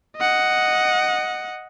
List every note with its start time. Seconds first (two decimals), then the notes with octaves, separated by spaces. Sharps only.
0.17 D#5 F#5